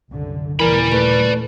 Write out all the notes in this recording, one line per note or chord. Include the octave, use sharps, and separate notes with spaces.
C2 F#2 D3
D#2 A#2 C#3 E3 A#4 D5 B5
A3 B4